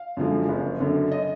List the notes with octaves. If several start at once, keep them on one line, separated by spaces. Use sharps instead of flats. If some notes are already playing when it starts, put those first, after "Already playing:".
Already playing: F5
F#2 D3 F3 G#3
F#1
F#2 D3
D#5